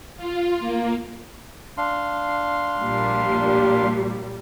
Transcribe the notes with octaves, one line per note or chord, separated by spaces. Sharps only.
F4
A#3
D4 F5 C6
A#1 A#2 G3